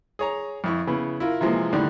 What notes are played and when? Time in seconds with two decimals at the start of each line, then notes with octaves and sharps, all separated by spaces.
0.19 G#4 C#5 A#5
0.64 F2 E4 C#6
0.87 C#3 B3 E4
1.20 E4 F4 A#4
1.41 C3 E3 F3 G#3 A#3
1.73 A2 D3 D#3 G3